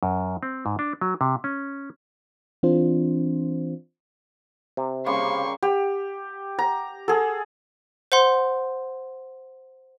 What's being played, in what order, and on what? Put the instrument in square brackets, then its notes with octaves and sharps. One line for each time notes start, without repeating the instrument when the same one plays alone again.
[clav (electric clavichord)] F#2
C4
G#2
D4
F#3
C3
C#4
[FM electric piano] E3 C4 D4 F4 C5
[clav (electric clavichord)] C3
[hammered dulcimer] C#3 G3 A#3 [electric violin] C6 C#6
[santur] G4
A#5
G#4 A4
[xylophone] C5 F#5 C6